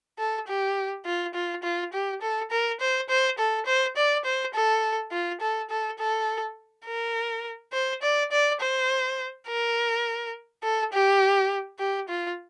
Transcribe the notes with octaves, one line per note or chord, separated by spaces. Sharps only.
A4
G4
F4
F4
F4
G4
A4
A#4
C5
C5
A4
C5
D5
C5
A4
F4
A4
A4
A4
A#4
C5
D5
D5
C5
A#4
A4
G4
G4
F4